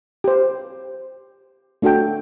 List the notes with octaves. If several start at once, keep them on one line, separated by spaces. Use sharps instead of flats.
G4 C5
A3 D4 F#4 A4 G5